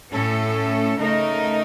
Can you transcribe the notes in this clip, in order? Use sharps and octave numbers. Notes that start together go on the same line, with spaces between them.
A2 A3 C#4 A4
C#3 A3 D#4 A#4 D#5